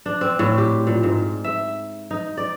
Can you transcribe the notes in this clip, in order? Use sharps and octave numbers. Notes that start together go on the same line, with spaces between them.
D4
C4
A2
G4
A#2
G#2
E5
D#4
D5